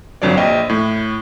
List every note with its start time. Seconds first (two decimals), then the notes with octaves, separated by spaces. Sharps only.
0.22 G1 F2 F#3 D4 C#5 D5
0.37 A#1 D#5 G5
0.69 A2